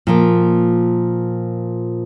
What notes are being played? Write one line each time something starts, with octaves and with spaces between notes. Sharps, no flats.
A#2 F3 A#3